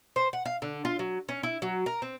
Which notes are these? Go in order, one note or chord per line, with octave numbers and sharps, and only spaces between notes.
C5
F#5
F5
D3
F4
F#3
C#4
E4
F#3
A#4
C4